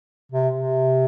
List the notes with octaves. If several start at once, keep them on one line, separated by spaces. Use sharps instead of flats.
C3
C3